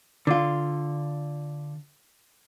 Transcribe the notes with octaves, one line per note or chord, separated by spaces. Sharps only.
D3 F4